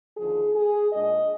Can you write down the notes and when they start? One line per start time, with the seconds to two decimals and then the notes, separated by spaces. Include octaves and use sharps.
0.17 D#2 D3 F3 G#4
0.55 G#4
0.93 A#2 G#3 D4 D#5